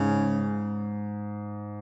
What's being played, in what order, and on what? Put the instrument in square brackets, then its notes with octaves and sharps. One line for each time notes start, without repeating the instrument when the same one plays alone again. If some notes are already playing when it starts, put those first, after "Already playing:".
Already playing: [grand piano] G#2 [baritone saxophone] C#3